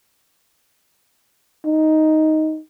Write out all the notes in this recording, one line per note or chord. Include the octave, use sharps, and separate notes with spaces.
D#4